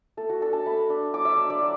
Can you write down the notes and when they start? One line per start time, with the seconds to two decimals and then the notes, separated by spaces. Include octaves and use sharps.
0.17 A3 A4
0.29 F#4
0.41 D4 A4
0.53 A5
0.66 A3 B5
0.90 D4
1.14 F#3 D6
1.25 E5
1.37 D4
1.50 D5
1.61 F#3